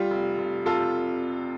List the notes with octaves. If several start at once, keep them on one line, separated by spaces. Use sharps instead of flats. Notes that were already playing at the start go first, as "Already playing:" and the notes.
Already playing: G3 F4
F1
F1
C3 F4 A4